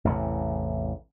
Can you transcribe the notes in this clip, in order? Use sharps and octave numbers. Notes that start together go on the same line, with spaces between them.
A1 E2 C3